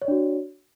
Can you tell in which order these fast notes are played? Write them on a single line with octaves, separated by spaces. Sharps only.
C#5 D5 D4 F#4